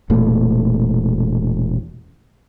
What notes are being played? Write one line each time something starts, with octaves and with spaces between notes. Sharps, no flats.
E1 A#2 A3